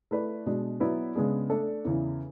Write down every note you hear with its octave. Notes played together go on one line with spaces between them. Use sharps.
A3 E4 B4 D5
B2 G#3 D4
F#3 B3 E4 B4 D5
C#3 G#3 B3 D4 G#4
A3 D4 A4 D5
E2 C#3 E3